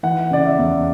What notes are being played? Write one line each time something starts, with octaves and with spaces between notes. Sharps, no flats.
E3 F#5
C#3 D5
E5
E2